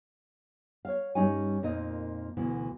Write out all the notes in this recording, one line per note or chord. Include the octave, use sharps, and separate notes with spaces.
C#5 F5
G2 G3 C#4 D#4 C#5 G#5
F2 A#2 A#3 D#4 D#5
D2 B2 E3